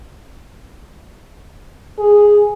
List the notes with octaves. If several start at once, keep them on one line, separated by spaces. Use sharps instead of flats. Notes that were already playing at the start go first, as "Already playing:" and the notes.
G#4